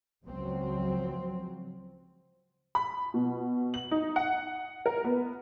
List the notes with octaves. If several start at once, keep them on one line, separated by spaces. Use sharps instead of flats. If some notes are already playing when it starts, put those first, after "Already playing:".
C#2 F3 F#3 C4
B5
B2
F#7
D#4
F#5
A#4
B3